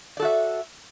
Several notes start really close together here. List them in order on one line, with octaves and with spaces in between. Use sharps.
D5 A4 F#4 E5